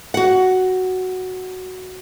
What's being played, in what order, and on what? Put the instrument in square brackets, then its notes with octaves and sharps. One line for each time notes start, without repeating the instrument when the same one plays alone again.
[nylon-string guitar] F#4 F#5